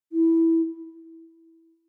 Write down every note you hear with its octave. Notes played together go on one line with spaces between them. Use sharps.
E4